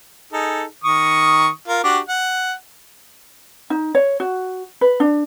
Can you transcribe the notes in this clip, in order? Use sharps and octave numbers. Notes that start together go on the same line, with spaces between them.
D#4 G#4 A4
D#3 C#6 D#6
F4 A#4
D4 F#4 G4
F#5
D#4
C#5
F#4
B4
D4